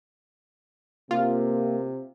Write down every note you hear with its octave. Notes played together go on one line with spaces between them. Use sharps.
C3 A#3 F4